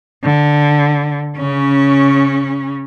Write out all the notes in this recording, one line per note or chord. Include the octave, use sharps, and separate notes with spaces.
D3
C#3 C#4